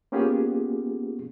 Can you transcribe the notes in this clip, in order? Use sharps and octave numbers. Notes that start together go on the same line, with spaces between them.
A#3 B3 C#4 F4 G4 G#4